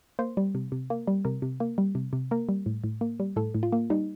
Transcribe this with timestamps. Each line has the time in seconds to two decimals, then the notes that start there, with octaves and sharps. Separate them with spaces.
0.19 A#3 C5
0.37 G3
0.55 C3
0.72 C3
0.90 A#3
1.07 G3
1.25 C3 A#4
1.42 C3
1.60 A#3
1.78 G3
1.95 C3
2.13 C3
2.31 A#3 A#4
2.49 G3
2.66 A2
2.84 A2
3.01 A#3
3.20 G3
3.36 A2 A4
3.55 A2
3.63 F4
3.72 A#3
3.90 G3 D#4